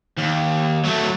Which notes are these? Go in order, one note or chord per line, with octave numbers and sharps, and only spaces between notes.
D#2
F#3 A3